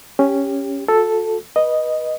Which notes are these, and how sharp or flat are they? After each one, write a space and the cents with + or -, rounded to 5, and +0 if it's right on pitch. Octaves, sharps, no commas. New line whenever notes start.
C#4 +0 G4 +15
F#4 -45 A4 +0
B4 -20 D#5 -5